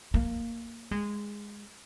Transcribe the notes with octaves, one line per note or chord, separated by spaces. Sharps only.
A#3
G#3